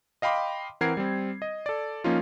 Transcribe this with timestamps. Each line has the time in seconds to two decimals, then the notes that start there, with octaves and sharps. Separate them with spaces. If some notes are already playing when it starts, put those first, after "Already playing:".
0.22 D#5 F5 G5 B5 C6 D6
0.81 E3 C4 A#4 F#5 G#6 C7
0.97 G3 C4
1.42 D#5
1.66 A4 D5
2.04 F3 A#3 C#4 D#4 F4